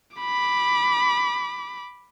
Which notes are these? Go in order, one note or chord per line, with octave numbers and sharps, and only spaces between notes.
B5 D6